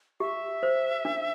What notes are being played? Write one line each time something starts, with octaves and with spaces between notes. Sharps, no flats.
G4 E5
C5
D4